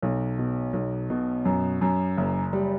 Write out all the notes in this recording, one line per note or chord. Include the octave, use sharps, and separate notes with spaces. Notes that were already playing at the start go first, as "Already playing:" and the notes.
B1
B2
B1
B2
F#2
F#2
F#1
G3